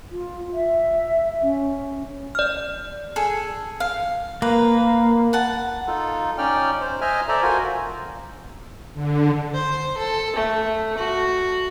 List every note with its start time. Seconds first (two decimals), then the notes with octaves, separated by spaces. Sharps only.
0.12 F4
0.53 E5
1.42 C#4
2.35 D5 F6
3.16 G#4 A4
3.80 F5
4.42 A#3 B4
5.33 F#5 A5
5.87 D#4 F4 A4
6.38 C#4 D#4 D5 G5 F6
6.81 C5
7.01 C5 D#5 E5 G#5 F6
7.28 A4 C5 D5 E5 A#5
7.42 F4 F#4 A#4 C5 G#5
8.94 D3
9.54 C5
9.97 A4
10.36 A3
10.98 F#4